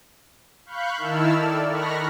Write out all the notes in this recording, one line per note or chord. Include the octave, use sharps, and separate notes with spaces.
F5 B5 C#6 F#6 G6
D#3 E4 A5 E6 F6
A4 D5
D#3 B5 C#6 F6 F#6 A#6